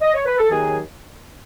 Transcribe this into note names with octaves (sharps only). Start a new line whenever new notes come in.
D#5
C#5
B4
A4
D#2 D#3 F#3 G#4